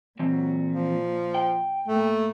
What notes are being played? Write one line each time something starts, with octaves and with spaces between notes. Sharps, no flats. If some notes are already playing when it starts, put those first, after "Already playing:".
A#2 E3 F#3 C4
F3
G5
A2 A3 A#3